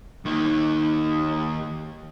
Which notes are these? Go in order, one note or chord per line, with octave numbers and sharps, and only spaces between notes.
D#2 D#4